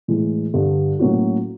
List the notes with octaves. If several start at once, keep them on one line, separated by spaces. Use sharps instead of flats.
A2 E3 G#3
G2 D3 G3
A2 F#3 A#3 C#4 F#4